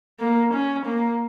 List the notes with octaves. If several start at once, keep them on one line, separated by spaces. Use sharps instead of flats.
A#3
C#4
A#3